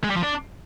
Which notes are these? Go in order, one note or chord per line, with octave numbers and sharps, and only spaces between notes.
G#3
G3
F3
D4